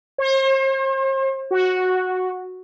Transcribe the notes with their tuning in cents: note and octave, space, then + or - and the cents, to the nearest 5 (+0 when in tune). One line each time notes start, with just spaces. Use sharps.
C5 +40
F#4 -5